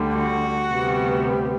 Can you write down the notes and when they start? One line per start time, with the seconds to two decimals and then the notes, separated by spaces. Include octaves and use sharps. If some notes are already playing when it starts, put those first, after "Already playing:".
Already playing: D2 D3 G3
0.17 F#4
0.72 D2 C3 G3 B3